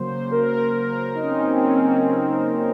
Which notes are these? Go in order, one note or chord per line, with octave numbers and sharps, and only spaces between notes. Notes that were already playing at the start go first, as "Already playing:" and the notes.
Already playing: C#3 F#3 A#3 C5
A#4
A#4
D#4
C#4
C4
C#4
C4
C#4
C4
C4